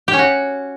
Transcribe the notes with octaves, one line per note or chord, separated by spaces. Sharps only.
G4
C#4
F#4